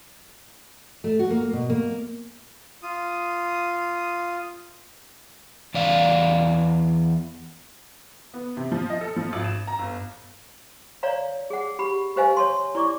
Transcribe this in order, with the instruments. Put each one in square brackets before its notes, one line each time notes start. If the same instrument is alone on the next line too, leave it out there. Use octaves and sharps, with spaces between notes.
[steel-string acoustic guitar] A3
F#4
A#3
B2
A#3
[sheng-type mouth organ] F4 D#6
[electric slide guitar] E2 D5 F5
[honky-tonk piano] B3
C3
F3
D#5
A4
F3
G#1
E7
A#5
G1
[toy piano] C#5 D5 F5 A#5
G#4 F#5
G4 B5
G4 B4 C5 D#5 F5 G#5
C#5 A5 C6
E4 D5 C#6 D6